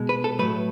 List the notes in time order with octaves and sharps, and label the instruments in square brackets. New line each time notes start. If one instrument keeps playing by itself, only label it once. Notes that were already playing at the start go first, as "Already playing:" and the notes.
Already playing: [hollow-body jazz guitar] B2 G#3
B4
A4
A2 F#3 A3 B4